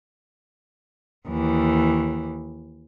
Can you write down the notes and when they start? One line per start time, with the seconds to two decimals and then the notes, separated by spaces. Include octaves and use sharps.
1.28 D#2 E3